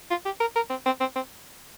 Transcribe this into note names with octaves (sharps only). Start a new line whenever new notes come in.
F4
G4
A#4
A#4
C4
C4
C4
C4